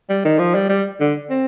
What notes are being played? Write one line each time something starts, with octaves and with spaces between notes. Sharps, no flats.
G3
D#3
F3
G3
G3
D3
C4